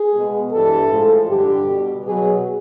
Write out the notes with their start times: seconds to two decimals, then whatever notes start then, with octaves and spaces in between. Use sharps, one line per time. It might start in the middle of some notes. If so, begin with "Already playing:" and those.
Already playing: G#4
0.12 B2 G#3
0.51 G2 E3 G3 A4
0.89 A2 F3 G#3
1.27 G2 D3 G3 G4
1.65 B2 G3
2.03 B2 F#3 G#4